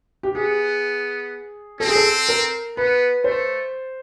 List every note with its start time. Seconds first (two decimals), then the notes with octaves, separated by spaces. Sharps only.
0.23 G4
0.35 B3 G#4
1.80 C4 A4
1.87 G#4
1.95 A4
2.29 A#4
2.77 B3 B4
3.24 A3 C5